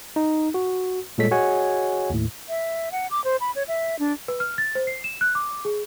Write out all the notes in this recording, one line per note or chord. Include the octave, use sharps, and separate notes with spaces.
D#4
F#4
A#2 G3 G#3 A4 C#5 B6
F#4 G#4 C#5 D#5 F#5 G#5
D#2 A2
E5
F#5
D6
C5
B5
C#5
E5
D4
B4
F6
A6
C5
C7
E7
F#6
D6
G#4